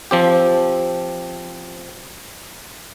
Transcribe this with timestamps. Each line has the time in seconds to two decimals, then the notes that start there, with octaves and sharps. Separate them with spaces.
0.11 F3 C4 G4